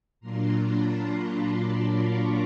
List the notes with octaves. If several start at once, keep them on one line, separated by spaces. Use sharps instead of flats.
A#2 F#3 A#3 D4 F4 A#5 C6
A5 B5
A#5 C6
C6 D6
B5 C#6